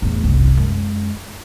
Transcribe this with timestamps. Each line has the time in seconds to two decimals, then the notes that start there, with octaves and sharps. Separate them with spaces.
0.02 E2 A2
0.23 F#1 C2
0.57 F#2 G#3